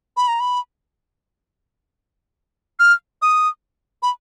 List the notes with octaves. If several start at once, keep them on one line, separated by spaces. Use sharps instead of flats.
B5
A#5
B5
F6
D#6
B5